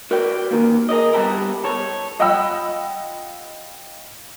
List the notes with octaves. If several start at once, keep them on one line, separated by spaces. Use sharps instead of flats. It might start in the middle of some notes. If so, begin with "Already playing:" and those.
F#4 A#4 B4 D5 G5
A#2 D#3 A#3
G#4 A#4 D5 D#5
G3 B3 E4 G4 A4 A#4
A4 C#5
F4 D#5 F#5 G5 B5 E6